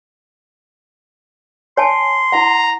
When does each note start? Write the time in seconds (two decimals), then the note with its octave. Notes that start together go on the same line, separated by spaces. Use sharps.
1.77 C#5 G#5 A5 C6
2.32 E4 F#5 A#5